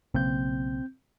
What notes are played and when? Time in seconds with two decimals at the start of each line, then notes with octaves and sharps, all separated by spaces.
0.14 B1 C#3 A#3 C4 G6